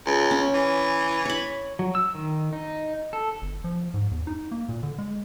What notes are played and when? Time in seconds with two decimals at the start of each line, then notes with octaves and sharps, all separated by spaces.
0.06 C#2
0.31 C#4
0.54 E3
1.25 C#5 B5
1.79 F#3
1.95 E6
2.15 D#3
2.53 D#4
3.13 A4
3.42 G1
3.64 F3
3.94 G#2
4.11 E2
4.27 D#4
4.52 A#3
4.69 A#2
4.83 D3
4.98 G#3